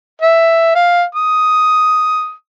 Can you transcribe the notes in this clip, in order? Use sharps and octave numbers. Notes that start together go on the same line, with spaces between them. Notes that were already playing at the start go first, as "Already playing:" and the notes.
E5
F5
D#6